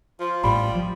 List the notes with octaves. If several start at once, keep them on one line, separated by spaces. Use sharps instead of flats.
F3 F4
A1 A2 G3 B5
F3